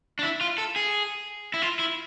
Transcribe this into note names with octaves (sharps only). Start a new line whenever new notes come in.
D4
E4
F4
A4
G#4
E4
F4
E4